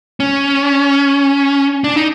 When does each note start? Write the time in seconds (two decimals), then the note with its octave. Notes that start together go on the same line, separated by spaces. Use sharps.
0.20 C#4
1.84 D4
1.96 D#4